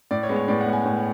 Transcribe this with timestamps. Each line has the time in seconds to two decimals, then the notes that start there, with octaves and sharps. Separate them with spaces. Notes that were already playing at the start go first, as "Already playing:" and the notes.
0.11 A2 D5
0.23 C#5
0.29 G#3 B3
0.36 C#5
0.48 A2 D5
0.61 F#5
0.67 G#3 B3
0.73 G#5
0.85 A2